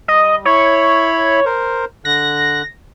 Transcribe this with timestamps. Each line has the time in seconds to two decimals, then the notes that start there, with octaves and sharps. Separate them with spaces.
0.08 G3 D#5
0.45 E4 C#5 B5
1.45 A#4 C5
2.05 D3 F#6 A#6